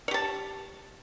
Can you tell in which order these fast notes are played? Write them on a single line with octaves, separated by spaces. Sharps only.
C#5 G4 A5